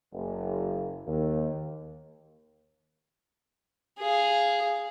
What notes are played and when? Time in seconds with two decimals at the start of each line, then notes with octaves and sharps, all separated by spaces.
0.13 F#1
1.06 D#2
3.99 G#4 F5